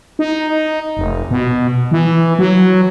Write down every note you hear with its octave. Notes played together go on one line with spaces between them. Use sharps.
D#4
F1
B2
E3
F#3